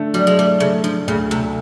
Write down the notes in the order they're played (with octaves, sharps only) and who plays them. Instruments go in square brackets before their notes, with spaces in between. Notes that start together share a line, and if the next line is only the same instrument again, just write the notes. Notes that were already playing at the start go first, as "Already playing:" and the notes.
Already playing: [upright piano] D3 A3
[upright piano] F#3 [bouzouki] G3
[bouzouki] G#3
[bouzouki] G3 [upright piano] A3
[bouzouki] C#3 [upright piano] A3
[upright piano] D3 [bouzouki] F3
[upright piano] D2 [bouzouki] C#3
[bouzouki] C3 [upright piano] A3